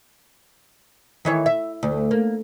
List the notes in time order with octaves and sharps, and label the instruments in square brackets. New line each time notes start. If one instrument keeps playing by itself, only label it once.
[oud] D#3 E3 C#5
E5
D2
A#3